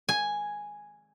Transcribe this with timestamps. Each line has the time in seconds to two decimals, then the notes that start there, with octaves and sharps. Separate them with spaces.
0.09 G#5